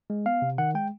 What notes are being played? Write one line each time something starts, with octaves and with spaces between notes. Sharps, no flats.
G#3
B3 F5
C3
D#3 F#5
G#3 G5